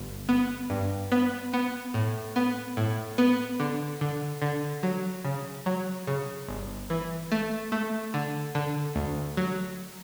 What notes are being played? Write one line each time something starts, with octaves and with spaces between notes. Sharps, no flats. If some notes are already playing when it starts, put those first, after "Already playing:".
Already playing: G1
B3
G2
B3
B3
A2
B3
A2
B3
D3
D3
D3
F#3
C#3
F#3
C#3
G1
E3
A3
A3
D3
D3
D2
F#3